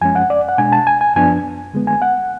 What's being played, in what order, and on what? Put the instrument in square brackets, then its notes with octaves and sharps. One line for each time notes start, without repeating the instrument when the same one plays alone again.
[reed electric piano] F#2 F3 G#3 C#4 G#5
F#5
D5
F#5
B2 G#3 D4 G#5
A5
G#5
G#5
F#2 F3 B3 D4 G#5
D3 G#3 B3
G#5
F#5